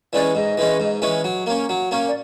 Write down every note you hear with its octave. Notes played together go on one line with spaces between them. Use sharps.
E3 G#3 C#4 D5
G#2 D#5
E3 G#3 C#4
G#2
E3 G#3 C#4
F#3
A#3 C#4
F#3
A#3 C#4
D5